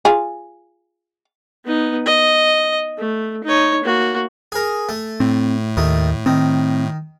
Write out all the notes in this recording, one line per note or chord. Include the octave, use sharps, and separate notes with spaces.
F4 G#4
B3 D#4
D#5
A3
D#4 C#5
A#3 F#4
G#4 A#4
A3
A2 C4
D#2 D#3 A3
D#3 C4